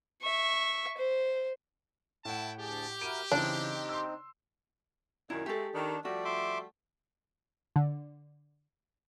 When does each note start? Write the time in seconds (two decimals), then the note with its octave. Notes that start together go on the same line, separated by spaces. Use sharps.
0.22 E5 C#6
0.97 C5
2.25 A2 E4 F#5 G5 A5
2.59 D2 G4 G#4 A5
3.01 E4 F#4 A#4 D7 D#7
3.32 C#3 E3 C4 D4 D#4
3.89 C6 E6
5.30 F#2 A#2 D#3 E4
5.46 G#3 A3 G4 A4
5.74 D#3 D4
6.05 F3 G3 A3 F#4 D5
6.25 E5 C6 D6
7.76 D3